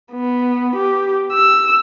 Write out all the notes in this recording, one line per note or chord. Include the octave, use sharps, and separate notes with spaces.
B3
G4
E6